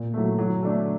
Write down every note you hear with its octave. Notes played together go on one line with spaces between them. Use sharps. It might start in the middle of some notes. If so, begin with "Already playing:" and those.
Already playing: A#2
F#3 A3
F#3
A3 D4 A4